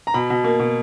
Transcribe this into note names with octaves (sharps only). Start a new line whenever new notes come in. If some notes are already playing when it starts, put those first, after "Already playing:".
A#5
B2 B5
B2
A#3
B2